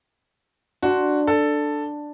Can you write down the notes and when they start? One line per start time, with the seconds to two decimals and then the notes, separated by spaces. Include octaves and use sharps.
0.83 D4 F#4 C6
1.27 A4